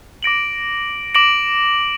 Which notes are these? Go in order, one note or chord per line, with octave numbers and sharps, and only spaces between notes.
D6 A#6 D7 F#7
D6 A#6 D7 F#7